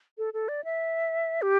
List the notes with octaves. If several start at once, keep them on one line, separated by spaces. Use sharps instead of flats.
A4
A4
D5
E5
G4